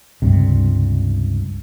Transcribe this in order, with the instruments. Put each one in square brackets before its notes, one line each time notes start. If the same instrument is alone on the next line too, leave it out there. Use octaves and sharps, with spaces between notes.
[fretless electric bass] C#2 G2 C3